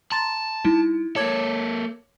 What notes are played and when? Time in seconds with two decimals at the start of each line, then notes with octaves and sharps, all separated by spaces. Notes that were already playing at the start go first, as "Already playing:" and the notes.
0.12 A5 A#5 C6 A6
0.65 G3 D#4 E4
1.16 A#3 A4 C#5 D6 G#6